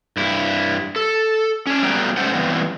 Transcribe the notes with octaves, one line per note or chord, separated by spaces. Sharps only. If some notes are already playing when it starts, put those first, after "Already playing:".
G2 E4
A4
C#4 D4
F#3 G3 A3 B3 G5 A#5
G#3 A3 C#4 C5 F#5
E3 G3 B3 C4